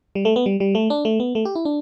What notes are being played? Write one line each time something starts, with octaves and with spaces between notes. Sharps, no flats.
G3
A3
B3
G3
G3
A3
D4
A3
B3
A3
G4
E4
D4